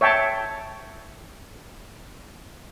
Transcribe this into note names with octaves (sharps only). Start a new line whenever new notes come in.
C#5 E5 G5 A5